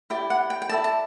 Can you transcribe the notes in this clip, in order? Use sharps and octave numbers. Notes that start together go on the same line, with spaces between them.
E4 G4 D5 G5
F#5
G5
G5
E4 A4 D5 A5
A5